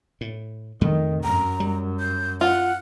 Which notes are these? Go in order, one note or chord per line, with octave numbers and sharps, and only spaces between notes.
A2
F2 D#3 A3
F#2 A#5
G3
G6
F4 F#5